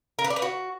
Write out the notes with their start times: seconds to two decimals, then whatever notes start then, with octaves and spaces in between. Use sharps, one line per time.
0.19 A#4
0.24 B4
0.30 D5
0.36 B4
0.42 F#4